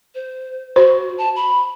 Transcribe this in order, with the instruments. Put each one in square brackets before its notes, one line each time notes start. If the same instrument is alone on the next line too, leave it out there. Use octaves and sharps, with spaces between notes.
[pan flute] C5
[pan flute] F#4 [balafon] C5
[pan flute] A5
B5